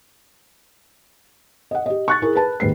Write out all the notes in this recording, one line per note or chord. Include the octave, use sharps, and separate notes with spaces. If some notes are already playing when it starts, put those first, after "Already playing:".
D#5 F#5
G4 D#5
C#6 F#6 A6
E4 G#4 A#4
B4 A5
D#2 G#2 B4 C7